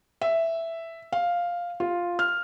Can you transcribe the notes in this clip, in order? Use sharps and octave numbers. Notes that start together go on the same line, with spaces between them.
E5
F5
F4
F6